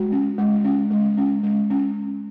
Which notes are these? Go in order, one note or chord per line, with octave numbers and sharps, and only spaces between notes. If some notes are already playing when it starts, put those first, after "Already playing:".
Already playing: G#3 F#4
C#4
G#3
C#4
G#3
C#4
G#3
C#4